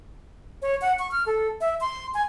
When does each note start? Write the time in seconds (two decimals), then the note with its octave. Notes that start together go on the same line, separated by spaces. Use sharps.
0.62 C#5
0.82 F#5
0.99 C#6
1.11 F6
1.26 A4
1.61 E5
1.81 C6
2.14 G#5